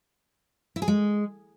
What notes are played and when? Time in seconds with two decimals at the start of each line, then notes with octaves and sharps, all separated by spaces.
0.76 E4
0.82 G#4
0.88 G#3